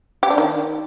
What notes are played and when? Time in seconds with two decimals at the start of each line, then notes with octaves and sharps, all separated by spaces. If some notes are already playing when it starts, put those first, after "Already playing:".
0.23 G4
0.30 D4
0.38 D#3